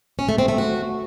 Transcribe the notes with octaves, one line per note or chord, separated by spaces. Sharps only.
C#4
A3
C4
A3
F#4